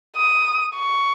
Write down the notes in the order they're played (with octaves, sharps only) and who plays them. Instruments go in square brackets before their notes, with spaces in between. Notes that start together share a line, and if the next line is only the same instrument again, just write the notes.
[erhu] D#6
C#6